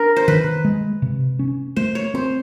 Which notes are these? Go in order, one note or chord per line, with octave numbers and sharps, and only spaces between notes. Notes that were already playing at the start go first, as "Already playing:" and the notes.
Already playing: D4 A#4
C5
D#3 B4
G#3
C3
C#4
A3 C5
C#5
C4 C5